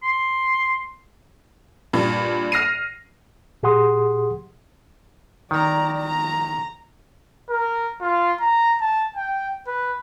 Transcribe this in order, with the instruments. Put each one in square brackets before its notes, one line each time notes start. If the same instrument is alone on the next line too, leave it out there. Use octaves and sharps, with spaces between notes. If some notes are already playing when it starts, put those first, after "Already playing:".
[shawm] C6
[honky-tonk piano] G2 A#2
F6 A#6 C7 D#7
[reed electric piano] A#2 G4 G#4 F#5 C6 D#6
[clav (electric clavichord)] D#3 [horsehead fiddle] D5 A#5
[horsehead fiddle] A#5
[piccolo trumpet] A#4
F4
A#5
A5
G5
B4